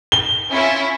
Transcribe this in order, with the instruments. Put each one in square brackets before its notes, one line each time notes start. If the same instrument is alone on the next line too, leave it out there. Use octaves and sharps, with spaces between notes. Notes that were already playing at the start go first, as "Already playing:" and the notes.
[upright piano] G7
[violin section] C#4 E4 F4